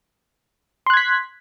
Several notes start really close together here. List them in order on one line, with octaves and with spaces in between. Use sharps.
C6 F#6 G#6 B6